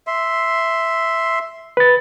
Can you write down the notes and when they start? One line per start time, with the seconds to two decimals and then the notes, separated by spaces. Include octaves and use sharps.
0.07 E5 C6
1.77 B4 A6